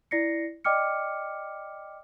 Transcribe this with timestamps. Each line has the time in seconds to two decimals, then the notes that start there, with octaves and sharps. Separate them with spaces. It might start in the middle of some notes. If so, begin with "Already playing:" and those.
0.11 E4 D5 A#6 C7 C#7
0.64 D5 D#5 G5 D6 F6 C#7